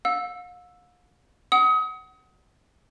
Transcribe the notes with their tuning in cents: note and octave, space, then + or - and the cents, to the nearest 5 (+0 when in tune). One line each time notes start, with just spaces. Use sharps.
F5 +40 E6 +0
F#5 +15 D#6 +30